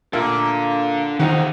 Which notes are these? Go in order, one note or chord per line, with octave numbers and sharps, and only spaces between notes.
A#2 A#3 D4 A4 E5
E2 C3 D#3 D#4 F4 G4 F#5